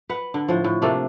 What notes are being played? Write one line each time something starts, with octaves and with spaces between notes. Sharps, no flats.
B4 F#5
D3
A2 F3
A2
C3 A3 A#3 D4